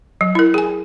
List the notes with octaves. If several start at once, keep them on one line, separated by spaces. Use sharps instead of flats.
F#3
E4 A#4
G#4 G#5